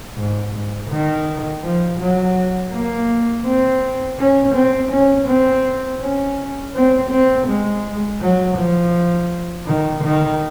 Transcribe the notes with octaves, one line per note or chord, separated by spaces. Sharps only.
G#2
G#2
D#3
F3
F#3
A#3
C4
C#4
C4
C#4
C4
C#4
C4
C4
G#3
F#3
F3
D#3
D#3